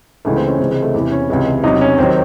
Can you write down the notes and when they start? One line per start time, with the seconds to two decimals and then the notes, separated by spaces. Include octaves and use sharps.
0.25 C#2 C#3 E3 G#3 A3
0.36 C4
0.48 C#4
0.59 C#2 C3 E3 G#3 C4
0.71 G#3
0.82 A3
0.94 E2 C3 E3
1.12 C#4
1.29 C#2 C3 E3 G#3
1.64 E2 C3 F#3 D#4
1.81 C#4
1.98 D#2 D#3 F#3 C4